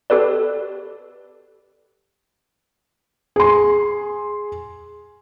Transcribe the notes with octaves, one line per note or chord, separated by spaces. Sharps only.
G4 A4 B4 D5
G#4 C6